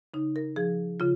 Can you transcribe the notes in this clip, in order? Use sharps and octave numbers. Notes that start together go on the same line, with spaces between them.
C#3 D#4
A#4
F3 G#4
C#3 F4